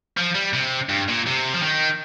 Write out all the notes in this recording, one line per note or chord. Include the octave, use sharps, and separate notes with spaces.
F3
G3
C3
G2
A#2
C3
F3
D#3